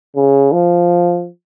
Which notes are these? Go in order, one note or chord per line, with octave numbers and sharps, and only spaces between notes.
C#3
F3